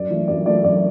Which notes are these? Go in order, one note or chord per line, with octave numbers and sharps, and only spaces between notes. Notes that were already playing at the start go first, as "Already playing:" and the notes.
Already playing: F#2 D5
E3 A3
F#2 D5
E3 A3 D5
F#2 D5